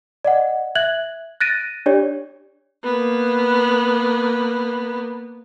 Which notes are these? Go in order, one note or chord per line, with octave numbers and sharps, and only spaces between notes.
D5 D#5 F#5
E5 F#6 G#6 F#7
F#6 A6 A#6 D7 D#7
D4 G4 C#5 D5
A#3 B3